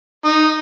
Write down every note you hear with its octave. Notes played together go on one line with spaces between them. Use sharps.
D#4